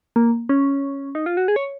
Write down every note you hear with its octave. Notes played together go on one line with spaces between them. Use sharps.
A#3
C#4
D#4
F4
F#4
G#4
C#5